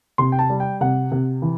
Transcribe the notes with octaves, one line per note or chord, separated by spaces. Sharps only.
C3 C6
G5
A5
G3
G5
C3 F#5
C3
E3